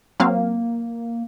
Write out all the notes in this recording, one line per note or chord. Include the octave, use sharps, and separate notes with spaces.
F#3 A#3 C4 F5